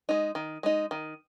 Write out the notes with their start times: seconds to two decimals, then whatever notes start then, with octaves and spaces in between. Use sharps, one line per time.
0.09 G#3 D#4
0.35 D#3
0.63 G#3 D#4
0.91 D#3